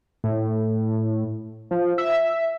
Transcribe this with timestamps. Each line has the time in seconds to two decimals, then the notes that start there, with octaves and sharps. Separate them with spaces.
0.24 A2
1.71 F3
1.98 E5